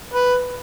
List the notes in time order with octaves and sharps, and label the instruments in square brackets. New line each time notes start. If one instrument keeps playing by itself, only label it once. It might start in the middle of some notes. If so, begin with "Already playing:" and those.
[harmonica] B4